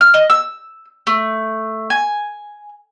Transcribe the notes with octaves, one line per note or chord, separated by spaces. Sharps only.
F6
D#5
E6
A3
G#5